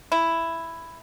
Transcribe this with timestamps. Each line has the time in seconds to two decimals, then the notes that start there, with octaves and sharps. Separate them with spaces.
0.12 E4